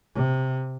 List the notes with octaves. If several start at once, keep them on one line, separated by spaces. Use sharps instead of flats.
C3